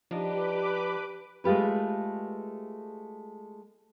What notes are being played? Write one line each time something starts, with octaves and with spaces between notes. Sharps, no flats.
F3 D4 D#4 G4 B4 D6
G#3 A3 F4 G4 B4